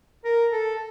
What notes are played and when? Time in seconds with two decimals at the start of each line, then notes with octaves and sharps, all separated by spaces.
0.25 A#4
0.52 A4